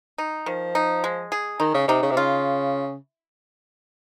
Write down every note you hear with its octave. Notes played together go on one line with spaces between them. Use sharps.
D#4
D#3 F3
D#4
G#3
G#4
D#3 D#4
C#3
C3 D#4
C#3
C3
C#3 F4